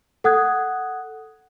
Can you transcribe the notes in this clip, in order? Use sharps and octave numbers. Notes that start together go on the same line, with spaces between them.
A4 F#5 D#6 F#6 G#6